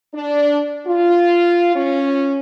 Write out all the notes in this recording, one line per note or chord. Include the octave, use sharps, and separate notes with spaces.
D4
F4
C#4